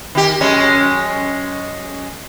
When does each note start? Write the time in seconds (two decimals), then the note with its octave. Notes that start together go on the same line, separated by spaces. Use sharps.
0.15 D#3 G4
0.41 F#2 G#3 C#4